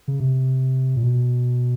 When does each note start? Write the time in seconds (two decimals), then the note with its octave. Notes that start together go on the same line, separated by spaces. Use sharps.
0.08 C#3
0.20 C3
0.96 A#2
1.03 B2